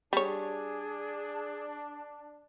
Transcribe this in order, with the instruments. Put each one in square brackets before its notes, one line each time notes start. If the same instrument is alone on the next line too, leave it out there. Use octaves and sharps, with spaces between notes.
[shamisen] G3 C#5 [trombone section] D4 [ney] G#4